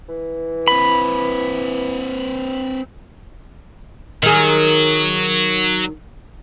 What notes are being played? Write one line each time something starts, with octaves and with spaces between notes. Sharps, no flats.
E3
C4 B4 B5
D#3 F#3 G#4